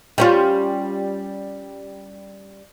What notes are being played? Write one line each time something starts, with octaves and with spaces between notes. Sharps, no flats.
G3 C#4 F4